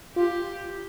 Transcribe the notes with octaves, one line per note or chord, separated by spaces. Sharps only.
F4 G4